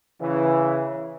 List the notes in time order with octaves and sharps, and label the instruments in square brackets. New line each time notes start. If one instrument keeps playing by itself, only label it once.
[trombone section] C#3 E3